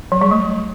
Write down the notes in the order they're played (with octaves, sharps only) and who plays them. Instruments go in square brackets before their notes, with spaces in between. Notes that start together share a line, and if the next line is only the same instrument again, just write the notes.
[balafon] F#3
G3
A3